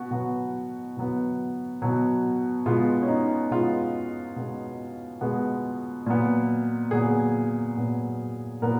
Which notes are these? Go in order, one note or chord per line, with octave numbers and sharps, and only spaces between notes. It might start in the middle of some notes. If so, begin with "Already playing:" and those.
Already playing: B2 B3 F#4
B2 F#3 B3 F#4
B2 F#3 B3
B2 F#3 B3
B2 G#3 B3 F4
C#4
D#4
B2 G#3 B3 F4
B2 G#3 B3
B2 G#3 B3
A#2 F#3 B3
A#2 F#3 B3 G#4
A#2 F#3 B3
A#2 F#3 B3 A#4